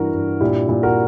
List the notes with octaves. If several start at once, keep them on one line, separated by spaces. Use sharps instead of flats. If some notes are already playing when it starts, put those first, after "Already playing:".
Already playing: G2 E3 F#4 A#4
G2
A#2 E4 G4
A#2
F#4 A#4